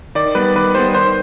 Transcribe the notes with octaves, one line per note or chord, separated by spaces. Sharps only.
D#3 D5
G3 B3 B4
D#3 B4
G3 B3 C5
D#3 C5